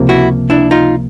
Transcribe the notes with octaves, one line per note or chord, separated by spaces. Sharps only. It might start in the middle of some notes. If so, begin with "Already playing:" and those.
Already playing: C#2 C3 F3 A#3
E4 F#4
D4 E4
D#4 F4